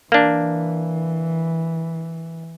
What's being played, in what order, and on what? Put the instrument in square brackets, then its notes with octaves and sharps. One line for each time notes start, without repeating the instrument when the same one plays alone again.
[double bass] E3 [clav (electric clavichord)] A#3 D4